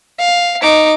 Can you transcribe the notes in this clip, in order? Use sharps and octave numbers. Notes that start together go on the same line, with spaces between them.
F5
D#4 D6